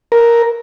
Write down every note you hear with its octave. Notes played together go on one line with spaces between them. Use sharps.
A#4